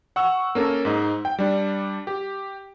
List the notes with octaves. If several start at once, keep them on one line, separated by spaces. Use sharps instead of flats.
F#5 C#6 E6
A#3 C#4 A4 A#4
G#2 D#4
G5
G3 D4
G4